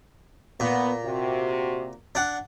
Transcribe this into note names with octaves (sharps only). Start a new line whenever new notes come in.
A#2 B3
C3 F#4
D4 F#5